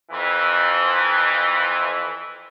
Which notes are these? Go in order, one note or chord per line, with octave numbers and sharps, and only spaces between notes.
F2 E3